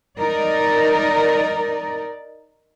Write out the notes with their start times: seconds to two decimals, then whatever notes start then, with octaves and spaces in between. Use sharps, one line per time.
0.18 D#4 A#4 D5